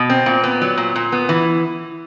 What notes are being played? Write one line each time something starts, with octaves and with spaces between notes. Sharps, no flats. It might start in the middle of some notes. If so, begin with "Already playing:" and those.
Already playing: B2
C4
A#2
B3
F#3
A#2
A#2
B3
E3